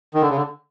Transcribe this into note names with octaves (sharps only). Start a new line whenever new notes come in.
D#3
D3
C#3
D3